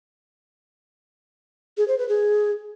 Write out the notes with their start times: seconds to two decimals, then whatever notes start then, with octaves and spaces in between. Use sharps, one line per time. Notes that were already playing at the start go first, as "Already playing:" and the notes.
1.77 G#4
1.88 C5
1.98 B4
2.09 G#4